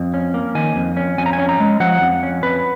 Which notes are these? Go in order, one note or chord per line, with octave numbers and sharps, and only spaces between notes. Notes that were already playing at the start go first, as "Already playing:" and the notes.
Already playing: F2
C#4
A#3
D#3 G#5
F2
C#4
F2 G#5
A#5
G#5
C#4
A#5
G#3
F3 F#5
F2
C#4
F2 B4